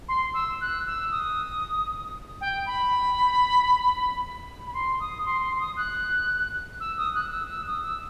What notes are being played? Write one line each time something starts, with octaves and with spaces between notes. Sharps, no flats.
C6
E6
F#6
E6
D#6
G5
B5
B5
C6
D#6
C6
C6
D#6
F#6
E6
D#6
F#6
E6
E6
D#6
E6